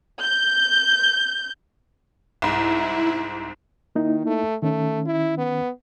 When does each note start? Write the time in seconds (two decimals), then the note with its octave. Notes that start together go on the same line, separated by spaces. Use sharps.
0.23 G6
2.42 C2 G#2 E4
3.95 D#3 A#3 D#4 E4
4.26 A3
4.62 D#3 A3 C#4
5.06 E4
5.38 B3